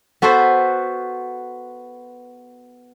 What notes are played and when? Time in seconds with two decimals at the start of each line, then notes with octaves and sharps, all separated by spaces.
0.22 B3 F#4 A4 B4 C5